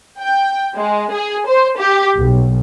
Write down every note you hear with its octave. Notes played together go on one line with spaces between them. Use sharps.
G5
G#3
G#4
C5
G4
B1